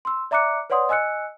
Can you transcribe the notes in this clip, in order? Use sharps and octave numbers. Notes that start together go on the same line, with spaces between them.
C6 E6
D5 E5 A#5 D6 F#6 C#7
B4 C#5 D5 F#5 C6 D#6
D#5 G#5 E6 F#6 C#7